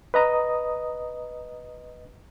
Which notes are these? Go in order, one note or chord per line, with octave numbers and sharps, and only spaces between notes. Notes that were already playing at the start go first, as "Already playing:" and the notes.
B4 D#5 A#5 D#6